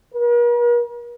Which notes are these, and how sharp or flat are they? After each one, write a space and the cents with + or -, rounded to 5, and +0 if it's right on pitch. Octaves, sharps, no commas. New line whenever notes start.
A#4 +45